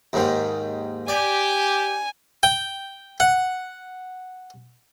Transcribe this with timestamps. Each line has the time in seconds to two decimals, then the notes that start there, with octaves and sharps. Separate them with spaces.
0.13 D#2 G#2 D#3
1.08 G4 D5 G#5
2.43 G5
3.20 F#5